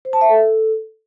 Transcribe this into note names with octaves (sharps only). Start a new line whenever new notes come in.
C5
A5
E5
A4